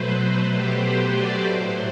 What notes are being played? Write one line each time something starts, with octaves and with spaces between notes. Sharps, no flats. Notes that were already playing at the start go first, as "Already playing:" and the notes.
Already playing: B2 F#3 A3 B4 C5
G4
C5
D5
A2 F#3 A3 C5